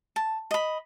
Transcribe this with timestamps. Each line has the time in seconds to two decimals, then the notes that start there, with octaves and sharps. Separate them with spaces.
0.16 A5
0.51 D#5 B5